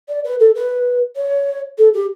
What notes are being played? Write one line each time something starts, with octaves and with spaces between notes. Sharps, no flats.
D5
B4
A4
B4
C#5
A4
G4